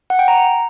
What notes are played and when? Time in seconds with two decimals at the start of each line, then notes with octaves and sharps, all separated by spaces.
0.10 F#5
0.19 G5
0.28 A#5